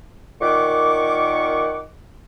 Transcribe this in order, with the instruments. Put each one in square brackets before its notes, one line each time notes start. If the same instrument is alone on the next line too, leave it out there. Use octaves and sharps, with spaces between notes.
[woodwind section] A#2 D#3 F#5 C#6 D6